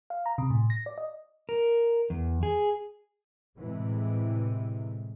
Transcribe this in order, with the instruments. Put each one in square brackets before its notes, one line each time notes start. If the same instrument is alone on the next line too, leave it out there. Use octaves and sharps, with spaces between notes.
[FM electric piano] F5
A#5
C3
A2
A#6
D5
D#5
[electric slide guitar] A#4
E2
G#4
[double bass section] A2 C3 E3 G#3